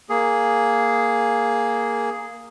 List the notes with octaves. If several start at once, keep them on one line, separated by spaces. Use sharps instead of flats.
A#3 G#4